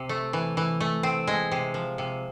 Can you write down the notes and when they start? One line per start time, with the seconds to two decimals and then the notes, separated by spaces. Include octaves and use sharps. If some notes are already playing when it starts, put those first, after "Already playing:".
Already playing: C3
0.09 A3
0.33 E3
0.57 E3
0.80 A3
1.03 C4
1.27 G#3
1.51 C3
1.74 F3
1.98 C3